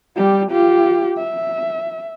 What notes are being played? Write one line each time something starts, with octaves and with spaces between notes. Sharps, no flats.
G3 G4
F4 G4
E5